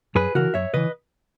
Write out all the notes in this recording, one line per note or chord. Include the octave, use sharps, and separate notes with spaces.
F#2 G#4 B4
C#3 E3 F#4 A#4
F#2 C#5 E5
C#3 E3 B4 D#5